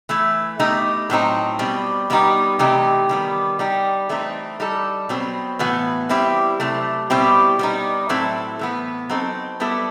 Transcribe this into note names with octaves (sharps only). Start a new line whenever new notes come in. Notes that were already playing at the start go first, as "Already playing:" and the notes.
E3 A3 E4
B2 A3 D#4 G4
A2 F#3 C4 D#4
B2 G3 C4
B2 G3 B3 D#4 G4
C3 E3 A3 D#4 G4
D#3 G3 B3
G3 D#4 G4
E3 A3 C4 D#4
G3 D#4 A4
B2 F#3 C4
A2 E3 B3 F#4
G3 C4 E4 G4
C3 F#3 A3
B2 G3 C4 E4 G4
G3 B3 D#4
A2 F#3 C4 E4 A4
A2 E3 B3
F#3 C4 D#4 A4
G3 B3 E4 A4